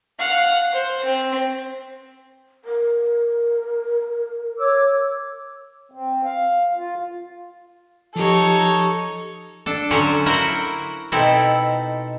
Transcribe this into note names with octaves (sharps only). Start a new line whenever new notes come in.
F5 F#5
C5
C4
A#4
C#5 D6 E6
C4
F5
F4
F3 D#4 G4 A4 C#5
D4 A4
D3 F#3 C#4 C5 C#5 G#5
E4 F#4 A#4 C5 F#5
B2 C4 D#4 E4 A4